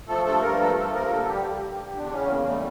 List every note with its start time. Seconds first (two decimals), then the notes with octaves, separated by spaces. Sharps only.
0.08 F3 A3 A4
0.25 G2 A3 A4
0.42 G2 A#3 A#4
0.60 F3 A3 A4
0.76 F3 A3 A4
0.94 G2 A#3 A#4
1.10 D3 A3 A4
1.27 G2 G3 G4
1.45 G3
1.62 G2
1.78 D3
1.96 E2 D3 D4
2.12 C#3 C#4
2.29 E2 A#3
2.46 G3 A3